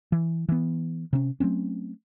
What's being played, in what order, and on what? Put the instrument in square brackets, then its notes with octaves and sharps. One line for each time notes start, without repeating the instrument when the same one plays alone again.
[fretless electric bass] E3
E3 B3
C3 C#4
F#3 A3 C4 C#4